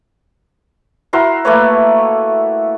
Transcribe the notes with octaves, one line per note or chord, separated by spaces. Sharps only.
E4 F#4 A#4 C6
A3 A#3 B4 C#5